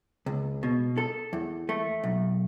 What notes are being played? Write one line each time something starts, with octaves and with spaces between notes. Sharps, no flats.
C#2
B2
A4
E2
A3
B1